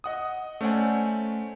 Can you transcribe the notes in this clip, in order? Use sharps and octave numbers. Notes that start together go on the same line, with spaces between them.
D#5 F#5 D#6
A3 C#4 C5 D5 F#5 G#5